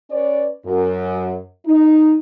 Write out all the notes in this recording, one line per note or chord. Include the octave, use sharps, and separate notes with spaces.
C#4 B4 C#5 D5
F#2
D#4